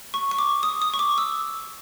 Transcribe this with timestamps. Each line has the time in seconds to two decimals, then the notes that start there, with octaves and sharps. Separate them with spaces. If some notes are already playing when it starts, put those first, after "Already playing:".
0.14 C#6
0.31 C#6
0.39 D6
0.63 D#6
0.82 D#6
0.94 C#6
0.99 D6
1.18 E6